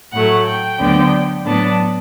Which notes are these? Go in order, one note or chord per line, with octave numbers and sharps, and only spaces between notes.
A2 F#3 A3 F#5
G5
D2 D3 F#3 B3 D4
A2 F#3 B3 D4 A5